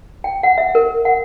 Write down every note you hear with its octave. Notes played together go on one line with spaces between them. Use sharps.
G5
F#5
E5
A#4
F#5